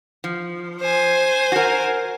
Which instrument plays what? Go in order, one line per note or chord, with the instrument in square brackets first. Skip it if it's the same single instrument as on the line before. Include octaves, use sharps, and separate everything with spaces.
[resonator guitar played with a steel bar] F3
[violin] C5 G#5
[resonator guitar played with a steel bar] F#4 A#4